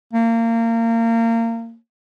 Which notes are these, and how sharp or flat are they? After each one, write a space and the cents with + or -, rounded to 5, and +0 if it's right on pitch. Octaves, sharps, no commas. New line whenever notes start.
A#3 -30